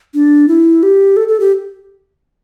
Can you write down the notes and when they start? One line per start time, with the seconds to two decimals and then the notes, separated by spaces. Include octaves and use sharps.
0.14 D4
0.48 E4
0.83 G4
1.17 A4
1.28 A4
1.40 G4